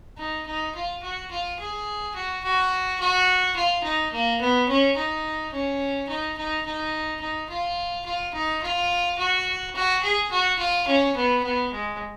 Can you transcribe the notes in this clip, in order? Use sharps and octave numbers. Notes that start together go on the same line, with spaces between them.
D#4
D#4
F4
F#4
F4
G#4
F#4
F#4
F#4
F4
D#4
A#3
B3
C#4
D#4
C#4
D#4
D#4
D#4
D#4
F4
F4
D#4
F4
F#4
F#4
G#4
F#4
F4
C#4
B3
B3
G#3